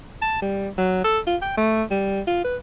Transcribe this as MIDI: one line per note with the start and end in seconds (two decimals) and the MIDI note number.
0.22 0.39 81
0.42 0.68 55
0.78 1.03 54
1.04 1.19 69
1.27 1.36 65
1.42 1.56 79
1.57 1.83 57
1.90 2.21 55
2.27 2.44 65
2.44 2.56 71